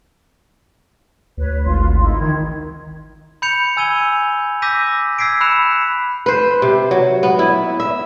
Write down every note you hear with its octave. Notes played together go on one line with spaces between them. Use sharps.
D2 B4 C#5
G#1 F4 C6
D#4 E4 C6
D#3 G#6
B5 G6 C#7 F7
G#5 E6 G#6 D#7 F7 G7
D6 E6 G6 A#6 B6 D#7
E6 G#6 B6 C7 D7
B5 E6 F#6 C#7 E7 F7
B4 C5
C3
F#3
B3
E4
E5